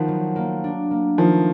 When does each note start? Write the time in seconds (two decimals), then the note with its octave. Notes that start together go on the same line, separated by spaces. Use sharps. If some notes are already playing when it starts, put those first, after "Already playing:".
Already playing: D#3 F3 B3
0.08 F#3
0.36 A#3
0.64 D4
0.91 A#3
1.18 D#3 F3 A3